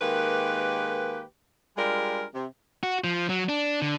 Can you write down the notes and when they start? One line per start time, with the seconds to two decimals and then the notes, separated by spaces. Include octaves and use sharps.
0.01 D#3 G#3 A#3 G4 B4
1.77 G3 G#3 D4 F4 G4 A#4
2.34 C3
2.83 F#4
3.04 F3
3.29 F#3
3.49 D4
3.82 D3